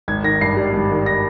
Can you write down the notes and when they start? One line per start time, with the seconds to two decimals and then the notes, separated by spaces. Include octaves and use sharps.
0.08 G#1 G#6
0.24 D#3 A#6
0.41 G2 C7
0.57 G3
0.73 G#1
0.91 D#3
1.06 A#6